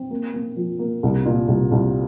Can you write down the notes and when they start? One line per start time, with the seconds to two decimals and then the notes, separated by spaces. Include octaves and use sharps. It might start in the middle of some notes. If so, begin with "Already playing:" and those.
Already playing: C4
0.10 A#3
0.34 A#3
0.57 F3
0.79 A#3
1.03 C2
1.25 A#2
1.48 C2
1.72 C2